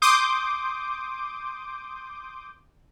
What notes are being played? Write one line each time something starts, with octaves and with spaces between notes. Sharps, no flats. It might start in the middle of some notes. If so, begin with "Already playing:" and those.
C6 D6 D#6 G6